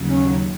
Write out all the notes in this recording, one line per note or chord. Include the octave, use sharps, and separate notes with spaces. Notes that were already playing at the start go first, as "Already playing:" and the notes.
Already playing: D#2 C#3 F#3
C#4